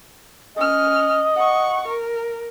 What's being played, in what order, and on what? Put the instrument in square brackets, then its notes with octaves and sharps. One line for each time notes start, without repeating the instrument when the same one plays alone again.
[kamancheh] C#4 F6 [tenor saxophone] D#5
[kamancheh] F#5 C#6
A#4